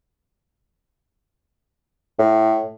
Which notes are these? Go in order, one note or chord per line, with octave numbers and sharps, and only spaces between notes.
A2